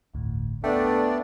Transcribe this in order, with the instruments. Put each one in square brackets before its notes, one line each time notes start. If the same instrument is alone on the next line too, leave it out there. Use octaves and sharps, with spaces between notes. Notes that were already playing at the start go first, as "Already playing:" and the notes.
[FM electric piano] G1 D2 A2
[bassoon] A3 [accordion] B3 D4 D5 [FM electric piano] G5